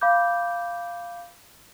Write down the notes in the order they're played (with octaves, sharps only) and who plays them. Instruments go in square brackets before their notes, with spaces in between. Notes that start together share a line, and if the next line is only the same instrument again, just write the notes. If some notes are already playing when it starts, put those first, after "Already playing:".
[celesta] F5 B5 D6 G6